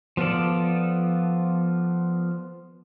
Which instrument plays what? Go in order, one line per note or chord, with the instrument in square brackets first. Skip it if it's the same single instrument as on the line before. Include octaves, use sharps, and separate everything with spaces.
[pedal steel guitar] F3 B3 F4 A4 D5